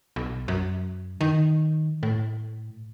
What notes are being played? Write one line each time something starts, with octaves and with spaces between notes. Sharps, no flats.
B1
F#2
D#3
A2